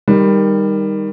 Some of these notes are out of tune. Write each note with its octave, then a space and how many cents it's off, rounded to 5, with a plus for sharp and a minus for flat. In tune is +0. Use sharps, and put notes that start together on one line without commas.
D#3 +0 G3 +15